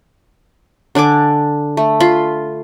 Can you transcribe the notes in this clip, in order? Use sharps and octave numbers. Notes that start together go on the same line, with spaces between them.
D3 D4 G#5 D6
A3
F4 B5 C6